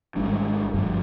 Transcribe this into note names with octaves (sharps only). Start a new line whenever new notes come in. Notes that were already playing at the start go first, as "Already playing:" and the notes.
G#1 G#2 G3 D4
G1 G2 F3